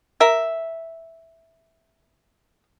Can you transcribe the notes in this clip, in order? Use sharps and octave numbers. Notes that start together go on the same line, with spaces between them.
A#4 E5